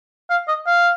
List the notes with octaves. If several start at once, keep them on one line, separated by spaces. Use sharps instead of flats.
F5
D#5
F5